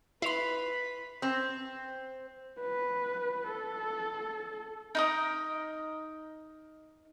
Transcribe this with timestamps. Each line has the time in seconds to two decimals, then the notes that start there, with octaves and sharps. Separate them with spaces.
0.22 E4 B4 B5 C6 C7 F7
1.22 C4
2.60 B4
3.47 A4
4.95 D#4 A#4 D#5